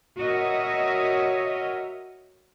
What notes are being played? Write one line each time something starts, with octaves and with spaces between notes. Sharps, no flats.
F#4 A#4 C#5 D#5 E5